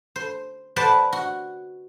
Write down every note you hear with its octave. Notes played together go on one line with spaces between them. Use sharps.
C5
B4 C5 D5 F#5 A5
F#4